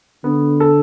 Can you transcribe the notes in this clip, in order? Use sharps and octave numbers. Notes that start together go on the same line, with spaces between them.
D3 B3
A4